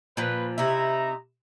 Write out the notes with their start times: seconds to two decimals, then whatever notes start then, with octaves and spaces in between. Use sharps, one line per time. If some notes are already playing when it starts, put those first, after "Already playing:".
0.17 A#2 F3 B4
0.58 C3 D#4 E4 E5 A#5